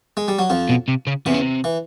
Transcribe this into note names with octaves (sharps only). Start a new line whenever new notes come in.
G#3
G3
F#3
F2 F3
B2
C3
C#3
E2 C3 E3
C#3
C3
E3